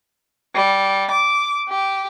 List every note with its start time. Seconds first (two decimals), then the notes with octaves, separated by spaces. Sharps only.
0.55 G3
1.11 D6
1.68 G4